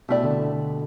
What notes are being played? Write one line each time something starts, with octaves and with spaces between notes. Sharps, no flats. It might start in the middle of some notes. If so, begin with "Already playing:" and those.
B2 A3 E4 G4 D5
D3
D3
D3